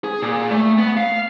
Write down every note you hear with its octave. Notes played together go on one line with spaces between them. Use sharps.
G#4
A#2
A3
B3
F5